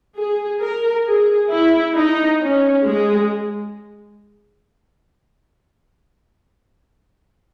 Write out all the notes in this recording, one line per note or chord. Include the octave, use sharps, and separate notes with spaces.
G#4
A#4
G#4
E4
D#4
C#4
G#3